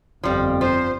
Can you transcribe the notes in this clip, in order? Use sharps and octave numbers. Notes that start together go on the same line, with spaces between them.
G1 F2 F3 G3
F3 C5